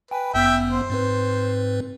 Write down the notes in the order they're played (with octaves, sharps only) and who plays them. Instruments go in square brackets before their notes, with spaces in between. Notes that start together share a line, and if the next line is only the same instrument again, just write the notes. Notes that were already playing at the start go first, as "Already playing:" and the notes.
[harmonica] B4 [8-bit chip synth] G5 G#5
[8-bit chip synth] G1 F#2 B3 [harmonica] E5 G5
[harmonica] C5
[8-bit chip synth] G#2 C4 B4